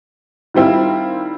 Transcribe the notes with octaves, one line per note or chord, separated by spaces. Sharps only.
D#3 G3 C4 E4 F4